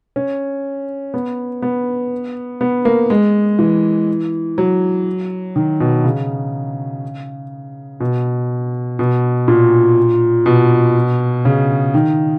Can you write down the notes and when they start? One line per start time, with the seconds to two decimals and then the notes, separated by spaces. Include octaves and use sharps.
0.16 C#4
1.14 B3
1.62 B3
2.61 B3
2.85 A#3
3.10 G#3
3.59 E3
4.58 F#3
5.56 D#3
5.80 B2
6.04 C#3
8.00 B2
8.99 B2
9.48 A#2
10.46 B2
11.45 C#3
11.94 D#3